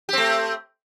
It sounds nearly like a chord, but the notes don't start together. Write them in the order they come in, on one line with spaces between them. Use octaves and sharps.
G4 C4 A3